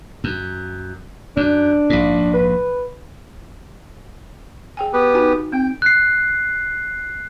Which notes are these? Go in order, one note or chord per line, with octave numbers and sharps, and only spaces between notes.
F#2
F#2 D4
A#1 G#2
B4
G#4 G5 G#5
B3 G4 B4
D#4 F#4 G#5
C4 G5
F#6 C7